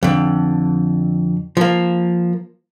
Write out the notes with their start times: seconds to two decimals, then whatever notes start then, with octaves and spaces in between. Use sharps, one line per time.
0.03 F2 D3
1.57 F3 A#3